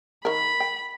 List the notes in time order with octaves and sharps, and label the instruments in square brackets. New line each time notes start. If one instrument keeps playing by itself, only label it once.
[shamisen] D#3 A#4 [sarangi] B5
[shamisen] G5